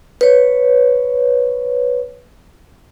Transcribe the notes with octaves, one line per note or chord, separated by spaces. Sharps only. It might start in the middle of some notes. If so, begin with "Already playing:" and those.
B4 C#5